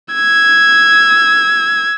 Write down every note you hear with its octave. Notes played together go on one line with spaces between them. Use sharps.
E6 G#6